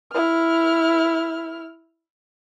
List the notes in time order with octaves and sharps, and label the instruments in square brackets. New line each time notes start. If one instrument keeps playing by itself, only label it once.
[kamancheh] E4 F6